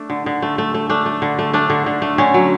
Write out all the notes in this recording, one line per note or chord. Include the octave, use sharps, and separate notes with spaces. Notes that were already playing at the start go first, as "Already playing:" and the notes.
Already playing: A3 D4
D3
D3
A3
A3
A3
A3 D4
A3
D3
A3
A3 D4
D3
D3
A3
D3 C#4
F#3